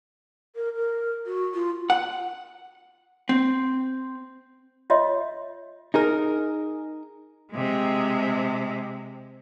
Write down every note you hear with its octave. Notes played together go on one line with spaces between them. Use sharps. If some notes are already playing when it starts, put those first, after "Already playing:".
A#4
A#4
F#4
F4
F#5
C4
F4 C#5 D#5 E5 C6
D#4 G#4 A#4
C3 G#3